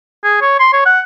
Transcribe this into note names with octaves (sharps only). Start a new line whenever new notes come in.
G#4
C#5
C6
C#5
F#5